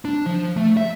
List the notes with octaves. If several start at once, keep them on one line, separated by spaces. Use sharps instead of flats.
D4
F3
A3
E5